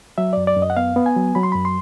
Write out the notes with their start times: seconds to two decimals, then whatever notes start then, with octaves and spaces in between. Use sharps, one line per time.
0.18 F#3 E5
0.33 F#2 D5
0.47 D5
0.57 F#2
0.62 D#5
0.70 F#5
0.77 B3 F5
0.96 B3
1.06 G#5
1.16 F#3
1.35 F#3 B5
1.43 C6
1.52 F#2 B5
1.65 C6